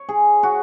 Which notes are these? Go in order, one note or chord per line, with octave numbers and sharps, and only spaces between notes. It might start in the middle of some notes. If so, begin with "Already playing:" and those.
Already playing: C#5
G#4
F#4